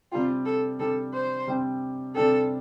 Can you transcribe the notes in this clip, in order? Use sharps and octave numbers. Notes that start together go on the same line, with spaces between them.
C3 G3 D4 F4 G4
A4
C3 G3 D4 G4 A4
C5
C3 G3 D4 G4
C3 G3 D4 G4 A4